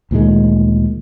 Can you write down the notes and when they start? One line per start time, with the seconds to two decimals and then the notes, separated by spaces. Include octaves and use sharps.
0.11 D2 A#2 D#3 G#3